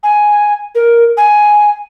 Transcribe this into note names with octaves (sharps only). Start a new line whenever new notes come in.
G#5
A#4
G#5